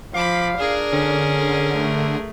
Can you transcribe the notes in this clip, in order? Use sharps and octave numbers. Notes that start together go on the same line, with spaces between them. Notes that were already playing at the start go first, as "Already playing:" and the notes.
F3 F5 B5 D6
D4 G#4 A#4
D3 C#4
A3